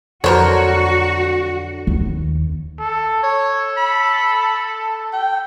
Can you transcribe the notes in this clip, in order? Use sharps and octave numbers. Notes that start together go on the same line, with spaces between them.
F2 D3 F#3 F#4 A#4 C5 C#5
D#2
A4
A4 C#5
B5
G5